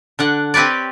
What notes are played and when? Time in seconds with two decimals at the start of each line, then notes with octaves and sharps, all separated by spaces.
0.19 D3 D4 F#5
0.54 C4 G4 B4 C#5 D5